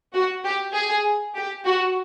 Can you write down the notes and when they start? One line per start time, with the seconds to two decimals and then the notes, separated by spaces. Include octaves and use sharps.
0.13 F#4
0.44 G4
0.74 G#4
1.35 G4
1.65 F#4